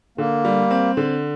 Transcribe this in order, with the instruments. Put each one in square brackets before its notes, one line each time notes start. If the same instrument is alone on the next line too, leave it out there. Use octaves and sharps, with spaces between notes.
[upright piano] D3 [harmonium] A#3
[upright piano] G3
C4
D3